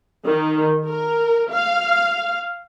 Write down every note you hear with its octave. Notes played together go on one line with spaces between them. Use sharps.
D#3
A#4
F5